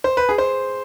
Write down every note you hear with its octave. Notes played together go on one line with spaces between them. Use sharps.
C5
B4
G#4
C5